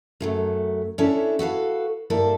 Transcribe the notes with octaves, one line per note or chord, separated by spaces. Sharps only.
F#2 F#3 A3
C#4 D4 E4 A4 C#5
F#4 A4 B4 F5
G2 A#3 E4 A4 A#4